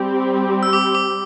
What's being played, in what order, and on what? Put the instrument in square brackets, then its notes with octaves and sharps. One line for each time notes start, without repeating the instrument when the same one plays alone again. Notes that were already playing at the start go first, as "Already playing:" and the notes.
Already playing: [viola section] G3 C4 G4
[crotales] E6
D6
D6